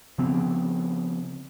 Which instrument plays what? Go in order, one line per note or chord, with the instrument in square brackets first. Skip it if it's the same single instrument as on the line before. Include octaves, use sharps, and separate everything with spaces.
[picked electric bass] C#3 F3 B3 C4